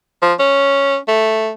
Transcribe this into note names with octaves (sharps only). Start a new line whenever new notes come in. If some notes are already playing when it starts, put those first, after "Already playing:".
F3
C#4
A3